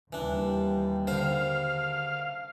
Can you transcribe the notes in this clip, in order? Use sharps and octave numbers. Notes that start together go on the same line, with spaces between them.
D#2 E3 G3 D4
D3 C5 F5